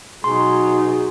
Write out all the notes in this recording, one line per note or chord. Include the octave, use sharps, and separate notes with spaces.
B2 F#3 D#4 G#4 C6